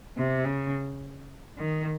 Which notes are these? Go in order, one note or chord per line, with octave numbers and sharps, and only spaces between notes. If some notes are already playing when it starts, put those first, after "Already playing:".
C3
C#3
D#3